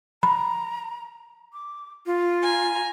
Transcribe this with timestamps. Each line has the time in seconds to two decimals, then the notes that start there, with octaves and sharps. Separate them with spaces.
0.23 A#5 B5
1.53 D6
2.06 F4
2.41 G#5 A#5